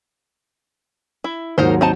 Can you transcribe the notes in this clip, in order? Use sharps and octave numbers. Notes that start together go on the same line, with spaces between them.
E4
D#2 G#2 F#3 D#4 A#4 C5
C4 D#4 A5